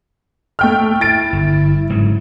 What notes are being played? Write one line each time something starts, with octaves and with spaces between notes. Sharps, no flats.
A3 G5 F6
E4 A6 D7
G1
G#2 C#3 F#3